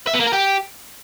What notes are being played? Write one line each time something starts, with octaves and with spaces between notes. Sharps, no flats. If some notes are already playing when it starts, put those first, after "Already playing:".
E5
B3
A#3
A#4
G4